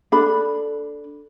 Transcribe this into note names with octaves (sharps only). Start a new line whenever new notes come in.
D4 A4 B5